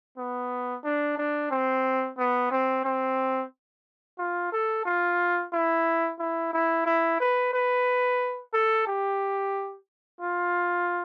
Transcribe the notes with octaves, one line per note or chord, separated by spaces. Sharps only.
B3
D4
D4
C4
B3
C4
C4
F4
A4
F4
E4
E4
E4
E4
B4
B4
A4
G4
F4